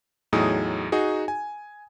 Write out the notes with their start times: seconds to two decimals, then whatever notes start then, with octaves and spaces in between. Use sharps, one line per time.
0.33 E2 A2 F#3 D#4 G#4 D#6
0.92 D#4 F#4 G#4
1.28 G#5